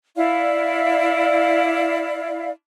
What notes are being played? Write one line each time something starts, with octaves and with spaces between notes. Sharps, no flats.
E4 D5 F5